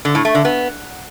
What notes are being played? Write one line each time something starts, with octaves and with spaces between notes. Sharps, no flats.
D3
A2
A3
D3
B3